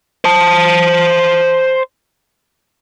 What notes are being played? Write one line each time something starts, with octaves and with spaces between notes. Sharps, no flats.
C5 A5